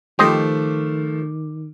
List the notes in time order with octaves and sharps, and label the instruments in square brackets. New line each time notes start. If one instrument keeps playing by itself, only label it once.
[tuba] D#3 [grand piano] F3 A3 D6 [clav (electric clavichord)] G4 C5 D#5